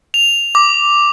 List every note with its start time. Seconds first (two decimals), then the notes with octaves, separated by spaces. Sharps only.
0.14 F7
0.55 D6